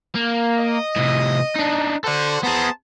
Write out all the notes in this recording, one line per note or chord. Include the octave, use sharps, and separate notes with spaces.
A#3
D#5
A2 C3
D4 D#4
F#4 A4 C5 D5
B3 G#4 C5 A5 A#5